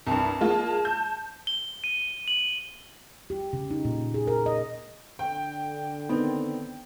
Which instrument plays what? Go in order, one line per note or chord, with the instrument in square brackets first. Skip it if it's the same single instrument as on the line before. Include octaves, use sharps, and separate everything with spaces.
[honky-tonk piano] C2 G2 [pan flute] A5
[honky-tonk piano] G#3 A#3 F4
G6
[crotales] G7
D#7
F#7
[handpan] G4
C#3
D#4
A#2
G#4
A#4
D#5
[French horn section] D3 [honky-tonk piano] G5
[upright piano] D#3 C4 D#4 [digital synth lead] B3